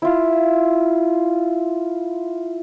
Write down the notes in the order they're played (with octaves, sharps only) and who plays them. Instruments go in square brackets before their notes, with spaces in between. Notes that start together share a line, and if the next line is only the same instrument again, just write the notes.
[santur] E4 F4